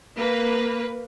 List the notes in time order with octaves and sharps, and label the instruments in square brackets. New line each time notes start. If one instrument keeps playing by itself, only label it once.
[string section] A#3 B4